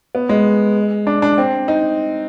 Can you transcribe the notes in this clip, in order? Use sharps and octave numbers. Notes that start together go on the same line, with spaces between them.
B3
G#3
D4
D4
C4
D#4